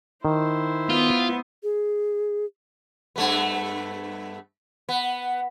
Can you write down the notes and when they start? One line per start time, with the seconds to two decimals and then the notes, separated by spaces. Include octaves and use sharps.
0.25 D#3 E4 C5
0.90 B3 F4
1.63 G#4
3.16 G2 A3 B3
4.89 B3